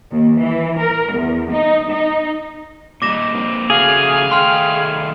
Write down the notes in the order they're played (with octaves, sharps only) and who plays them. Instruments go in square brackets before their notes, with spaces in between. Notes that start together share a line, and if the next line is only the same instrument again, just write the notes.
[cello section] D#2
E3
A#4
E2
D#4
D#4
[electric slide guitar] A#2 G3 D#4 [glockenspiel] D6 A#6 E7
[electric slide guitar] A#3 C4
[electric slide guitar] C#3 A3 F#4 [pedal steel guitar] G#4 [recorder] F5
[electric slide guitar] D#3 A3 G5 [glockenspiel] C6 F6